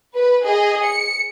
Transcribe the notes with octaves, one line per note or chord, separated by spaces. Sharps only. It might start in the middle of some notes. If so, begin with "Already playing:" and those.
B4
G#4 D#5
C#7